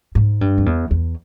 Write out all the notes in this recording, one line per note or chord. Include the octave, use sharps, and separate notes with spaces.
G#2
G2
F2
E2
E2